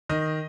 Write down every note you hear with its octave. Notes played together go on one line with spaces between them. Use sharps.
D#3 D#5